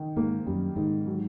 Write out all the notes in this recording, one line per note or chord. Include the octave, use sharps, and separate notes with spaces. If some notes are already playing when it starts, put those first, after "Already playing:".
Already playing: D#3
G#2 A#3
F#2 G3
G#2 D#3
F#3